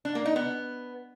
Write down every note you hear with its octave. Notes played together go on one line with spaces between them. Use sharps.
D4
A#3
D#4
B3